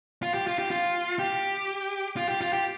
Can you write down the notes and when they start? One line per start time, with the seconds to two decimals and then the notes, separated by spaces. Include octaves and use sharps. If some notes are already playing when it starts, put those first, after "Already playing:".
0.23 F4
0.34 G4
0.47 F4
0.59 G4
0.71 F4
1.19 G4
2.17 F4
2.29 G4
2.41 F4
2.53 G4